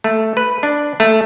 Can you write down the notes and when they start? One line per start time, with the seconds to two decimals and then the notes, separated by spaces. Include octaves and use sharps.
0.04 A3
0.37 B4
0.63 D4
1.00 A3